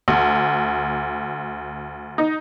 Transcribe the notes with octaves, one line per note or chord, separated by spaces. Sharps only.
D2
D#4